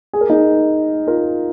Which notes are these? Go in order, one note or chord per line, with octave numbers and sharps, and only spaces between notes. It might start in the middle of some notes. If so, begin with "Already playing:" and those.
G#4
A#4
D#4 G#4
F4 A#4